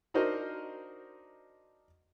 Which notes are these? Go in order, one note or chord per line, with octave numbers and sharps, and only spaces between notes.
D4 D#4 F#4 A#4 C5 D#5